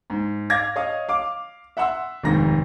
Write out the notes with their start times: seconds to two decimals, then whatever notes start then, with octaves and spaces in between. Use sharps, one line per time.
0.10 G#2
0.50 F5 D6 G#6 A#6
0.76 C#5 D#5 F5 D#6
1.09 F5 D6
1.77 E5 F#5 C6 E6
2.24 F1 D#2 G#2 A#6